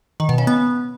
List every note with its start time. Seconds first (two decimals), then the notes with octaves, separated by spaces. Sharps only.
0.20 D#3
0.29 B2
0.38 C#3
0.47 B3